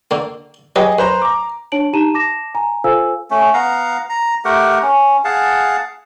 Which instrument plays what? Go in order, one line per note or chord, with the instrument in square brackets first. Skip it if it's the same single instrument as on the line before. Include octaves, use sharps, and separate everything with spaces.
[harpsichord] D3 A#3
[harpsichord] F#3 G4 B4 [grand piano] G#4 D#5
[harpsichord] F#2 [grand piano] B4 C5 A#5
[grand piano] A#5 D6
[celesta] D4 C#5 A5 D7 F#7
D#4 G4 A5 A#5 D#7 E7
A5 D6 A#6 E7
G#5 A#5
F4 A4 C5 F5 G#5 E6
[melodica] A3 C#4
B3 F5 F#5 A#5
A#5
A3 G4 A#4 F#5
C#4
G#4 F5 F#5 A5